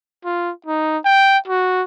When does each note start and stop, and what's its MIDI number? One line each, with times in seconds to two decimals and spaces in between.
0.25 0.51 65
0.66 0.97 63
1.05 1.38 79
1.48 1.84 66